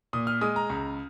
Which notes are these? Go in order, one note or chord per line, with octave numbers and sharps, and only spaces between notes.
A#2 D#6
F6
G#3 D#6
A#5
C#2